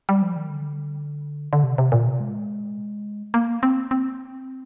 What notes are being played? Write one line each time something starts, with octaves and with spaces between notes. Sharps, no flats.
G3
F3
D#3
D3
D3
C3
C3
A#2
C3
G#3
A#3
C4
C4